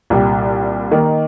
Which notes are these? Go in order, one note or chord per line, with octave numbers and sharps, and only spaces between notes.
C2 A#2 G3
D#3 A#3 D#4